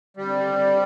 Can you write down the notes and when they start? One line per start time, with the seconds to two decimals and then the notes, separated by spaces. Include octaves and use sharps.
0.16 D3 G3 C4 G4